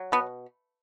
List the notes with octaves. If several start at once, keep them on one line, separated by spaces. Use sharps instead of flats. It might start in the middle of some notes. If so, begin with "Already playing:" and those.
Already playing: F#3
B2 B3